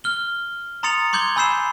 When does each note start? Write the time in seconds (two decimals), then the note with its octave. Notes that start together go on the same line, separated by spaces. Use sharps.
0.04 F6 G7
0.83 A#5 C6 D#6 A6 C#7 F7
1.13 C6 D6 G6 G#6 F#7 G7
1.36 G#5 B5 E6 G6 C7 E7